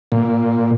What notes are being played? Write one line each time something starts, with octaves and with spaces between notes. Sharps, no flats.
A#2